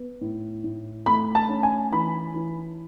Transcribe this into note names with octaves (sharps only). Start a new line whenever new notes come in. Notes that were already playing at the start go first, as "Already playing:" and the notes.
Already playing: B3
A2
A2
A3 B5
A5
C#4
G#5
E3 B5
E3